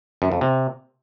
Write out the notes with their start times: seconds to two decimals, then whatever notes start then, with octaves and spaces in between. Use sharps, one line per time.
0.22 F#2
0.32 F2
0.41 C3